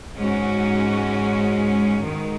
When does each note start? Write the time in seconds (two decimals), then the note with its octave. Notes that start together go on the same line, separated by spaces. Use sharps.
0.16 G#2 G#3 C#4 F#4
2.04 G#2 D#3 G#3